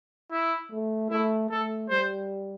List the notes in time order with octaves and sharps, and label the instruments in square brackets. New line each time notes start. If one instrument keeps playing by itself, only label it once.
[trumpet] E4
[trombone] A3
[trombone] A3 [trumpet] E4
[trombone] A3 [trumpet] A4
[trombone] G3 [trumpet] C5